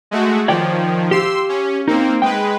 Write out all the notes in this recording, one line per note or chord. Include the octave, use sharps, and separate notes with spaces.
G#3 A3 F#4
D#3 F3 C#5 D5 G5
G4 F5 C6 E6
C#4
A#3 C4 D#4
G#3 B4 G5